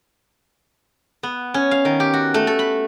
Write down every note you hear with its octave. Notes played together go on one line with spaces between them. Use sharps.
B3
C#4
F5
D#3
G4
F#4
A3
A4
B5